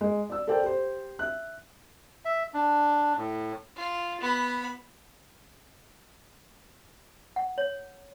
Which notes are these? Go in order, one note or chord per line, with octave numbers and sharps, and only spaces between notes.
G#3
D5 E6
A4 A#4 C5 D5 G5
G4 C5
E5 F#6
E5
D4
A2
F4
B3 B5
F#5
C#5